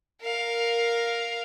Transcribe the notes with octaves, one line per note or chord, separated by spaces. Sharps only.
A#4 F5